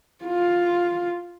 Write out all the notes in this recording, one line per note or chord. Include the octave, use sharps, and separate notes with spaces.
F4